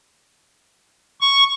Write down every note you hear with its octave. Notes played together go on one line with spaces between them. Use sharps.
C#6